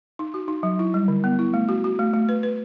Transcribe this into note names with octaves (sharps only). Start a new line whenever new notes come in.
D#4
F#4
D#4
F#3
E4
G3
D3
B3
E4
A3
F#4
F#4
A3
A3
B4
B4